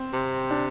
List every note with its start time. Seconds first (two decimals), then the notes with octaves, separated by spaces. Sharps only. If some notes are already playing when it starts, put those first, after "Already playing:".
Already playing: C4
0.13 C3
0.51 D4